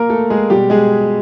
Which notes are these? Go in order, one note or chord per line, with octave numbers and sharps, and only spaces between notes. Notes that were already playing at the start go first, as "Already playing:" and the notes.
Already playing: A#3 A#4
A3 A4
G#3 G#4
B2 G3 G#3 G4
G#3 G#4